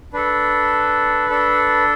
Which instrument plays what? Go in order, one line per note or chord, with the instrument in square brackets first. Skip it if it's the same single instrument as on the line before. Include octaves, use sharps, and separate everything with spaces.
[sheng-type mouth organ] D4 A4 B4
D4 A4